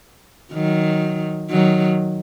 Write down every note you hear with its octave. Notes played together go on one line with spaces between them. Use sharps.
D#3 F#3
D#3 F#3